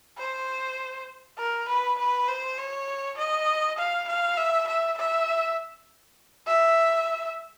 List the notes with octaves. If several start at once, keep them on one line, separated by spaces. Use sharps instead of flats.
C5
A#4
B4
B4
C5
C#5
D#5
F5
F5
E5
E5
E5
E5